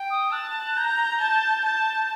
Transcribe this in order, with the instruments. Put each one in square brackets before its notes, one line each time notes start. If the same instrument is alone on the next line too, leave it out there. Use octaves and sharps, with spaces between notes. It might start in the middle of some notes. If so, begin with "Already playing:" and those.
Already playing: [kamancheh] G5
[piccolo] D#6
[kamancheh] A5 [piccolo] F#6
[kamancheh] A#5 [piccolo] G6
[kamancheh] A5
A5